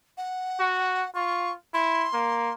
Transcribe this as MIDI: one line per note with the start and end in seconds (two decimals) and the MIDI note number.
0.17 1.10 78
0.60 1.04 66
1.15 1.53 65
1.15 1.52 85
1.74 2.07 64
1.74 2.53 84
2.14 2.52 58